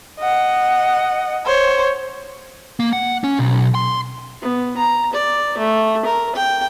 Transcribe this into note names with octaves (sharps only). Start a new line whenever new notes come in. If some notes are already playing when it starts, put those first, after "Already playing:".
D#5 F#5
C5 C#5
A#3
F#5
C#4
B1
C6
B3
A#5
D5
A3
A#4
G5